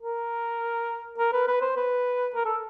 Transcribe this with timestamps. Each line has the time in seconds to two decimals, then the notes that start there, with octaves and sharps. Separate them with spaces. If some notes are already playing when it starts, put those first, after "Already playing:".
0.02 A#4
1.18 A#4
1.33 B4
1.48 B4
1.61 C5
1.76 B4
2.35 A#4
2.45 A4